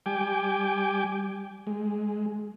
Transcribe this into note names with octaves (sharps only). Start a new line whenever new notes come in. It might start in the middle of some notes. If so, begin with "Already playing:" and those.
G3 G5 G#5 D6
G#3